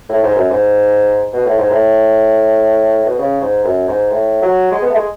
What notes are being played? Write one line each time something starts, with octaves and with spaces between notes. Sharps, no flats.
A2
G#2
F#2
G#2
B2
A2
G#2
A2
B2
C#3
G#2
F#2
G#2
A2
F#3
G#3
B3
A3
G#3